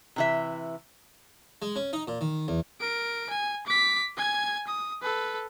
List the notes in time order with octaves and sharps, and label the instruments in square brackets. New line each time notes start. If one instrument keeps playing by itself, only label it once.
[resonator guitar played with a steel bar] C3 E3 E5
[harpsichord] G#3
C#4
D#4
A#2
D#3
E2
[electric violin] A#4 D7
G#5
D6 B6
G#5 G#6
D#6
A4 B4